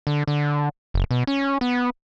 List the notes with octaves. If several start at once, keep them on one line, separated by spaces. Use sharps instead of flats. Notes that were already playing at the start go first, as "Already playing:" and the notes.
D3
D3
F#1
B2
C#4
B3